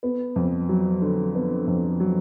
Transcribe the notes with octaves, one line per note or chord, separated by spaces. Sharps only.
B3
F2
F#3
D3
B3
F2
F#3